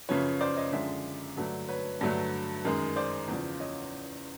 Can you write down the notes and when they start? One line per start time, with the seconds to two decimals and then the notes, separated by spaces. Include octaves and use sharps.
0.09 F#2 C#3 F3 B4 C#5
0.41 C5 D5
0.56 C#5 D#5
0.73 F#2 D3 F3 G#3 D5 E5
1.37 G2 D3 F#3 A3
1.69 B4 C#5
2.01 G2 D3 F#3 A3
2.65 F#2 D#3 G#3
2.96 C5 D5
3.28 E2 C#3 F3
3.60 C#5 D#5